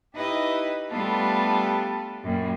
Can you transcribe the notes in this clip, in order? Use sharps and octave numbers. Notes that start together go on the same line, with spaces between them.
D#4 E4 G4 B4 D#5
G3 A3 B3 D4 F4 A4
F#2 A#2 G3